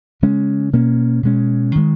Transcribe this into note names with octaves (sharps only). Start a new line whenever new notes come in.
C#3 G#3 C#4
B2 A#3 C#4
B2 G#3 C#4
D#3 G#3